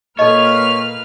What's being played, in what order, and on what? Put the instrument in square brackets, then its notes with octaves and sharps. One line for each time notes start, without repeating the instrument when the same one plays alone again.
[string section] A#2 B4 F6 [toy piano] A4 D#5 [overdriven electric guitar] C#5